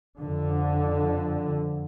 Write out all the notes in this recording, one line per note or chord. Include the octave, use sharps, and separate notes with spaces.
F2 D3